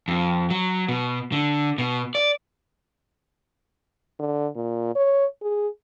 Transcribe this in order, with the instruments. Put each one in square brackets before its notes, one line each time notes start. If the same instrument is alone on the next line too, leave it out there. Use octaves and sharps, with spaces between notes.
[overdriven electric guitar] F2
F#3
B2
D3
B2
D5
[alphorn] D3
A#2
C#5
G#4